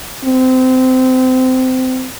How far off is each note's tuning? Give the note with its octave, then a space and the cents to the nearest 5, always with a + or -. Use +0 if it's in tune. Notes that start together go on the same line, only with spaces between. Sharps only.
C4 -25